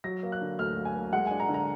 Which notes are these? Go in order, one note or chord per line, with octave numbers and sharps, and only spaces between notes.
F#3 A#6
A#3
F#6
D3
D2 F6
F#3
G#5
A#3
G#3 F#5
D4 G#5
A#5
D3
A#5